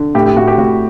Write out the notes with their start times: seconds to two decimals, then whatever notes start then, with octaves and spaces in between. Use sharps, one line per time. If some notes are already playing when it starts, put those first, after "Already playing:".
Already playing: D3
0.15 A2 G4
0.26 G4
0.36 A2 F#4
0.47 G4
0.58 A2 F#4